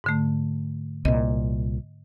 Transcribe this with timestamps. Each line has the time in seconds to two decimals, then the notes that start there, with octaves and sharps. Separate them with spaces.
0.04 G#2 D3 A3
1.05 C2 A#2 D#5